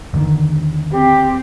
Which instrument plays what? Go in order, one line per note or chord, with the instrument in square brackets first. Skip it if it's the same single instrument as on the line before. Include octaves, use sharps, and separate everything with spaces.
[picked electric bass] E2 D3 D#3
[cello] C4 [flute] G4